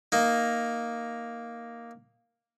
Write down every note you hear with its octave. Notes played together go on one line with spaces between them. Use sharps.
A#3 D#4